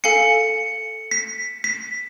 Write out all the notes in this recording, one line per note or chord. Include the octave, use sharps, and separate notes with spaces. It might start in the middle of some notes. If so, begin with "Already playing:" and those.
A4 F5 G#5 C#7
B6
B6